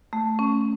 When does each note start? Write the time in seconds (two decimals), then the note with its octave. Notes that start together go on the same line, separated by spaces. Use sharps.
0.13 A3
0.39 C#4